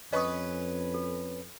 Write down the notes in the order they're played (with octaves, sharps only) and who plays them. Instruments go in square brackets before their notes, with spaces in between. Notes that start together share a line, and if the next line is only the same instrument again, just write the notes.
[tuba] F2 [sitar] C#4 B4 [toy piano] D#5 C#6 D#6
[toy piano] A4